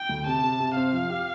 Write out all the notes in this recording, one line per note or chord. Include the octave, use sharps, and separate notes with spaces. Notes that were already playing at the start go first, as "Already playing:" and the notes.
Already playing: G5
D2
C3 A5
C3
C3
C4 F5
F3
G4